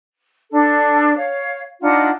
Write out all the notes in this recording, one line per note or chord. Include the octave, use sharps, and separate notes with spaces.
D4 A4
C#5 F5
D4 D#4 F4 F#5